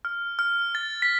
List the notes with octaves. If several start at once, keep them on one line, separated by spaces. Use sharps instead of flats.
F6
F6
A6
B6